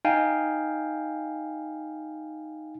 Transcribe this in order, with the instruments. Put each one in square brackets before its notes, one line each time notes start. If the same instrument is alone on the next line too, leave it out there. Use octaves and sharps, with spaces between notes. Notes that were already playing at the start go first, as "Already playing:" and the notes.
[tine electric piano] D#4 F5 G5 G#5